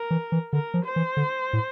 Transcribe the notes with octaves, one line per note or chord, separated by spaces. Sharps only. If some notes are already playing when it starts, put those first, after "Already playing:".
Already playing: A#4
E3
E3
D3 A#4
F3
C5
E3
D3
A2